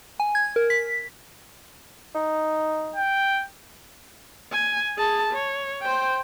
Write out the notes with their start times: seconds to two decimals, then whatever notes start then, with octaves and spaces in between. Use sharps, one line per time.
0.20 G#5
0.35 G#6
0.56 A#4
0.70 B6
2.15 D#4
2.95 G5
4.53 G#5
4.98 G#4 A5
5.33 C#5
5.82 C5 G5